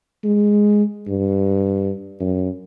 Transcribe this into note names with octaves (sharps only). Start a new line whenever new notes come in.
G#3
G2
F#2